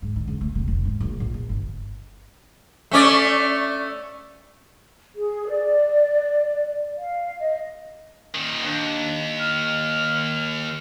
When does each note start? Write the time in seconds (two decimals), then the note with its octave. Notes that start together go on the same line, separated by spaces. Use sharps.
0.02 G#2
0.16 D#3
0.27 C#2
0.41 A3
0.55 C3
0.68 F1
0.85 G#2
1.00 A#1
1.20 A#1
1.34 B2
1.49 G1
2.91 A3 C#4 D5
5.15 G#4
5.48 D5
6.95 F5
7.39 D#5
8.34 A#2 D#3
8.63 D#2 D4
9.39 F6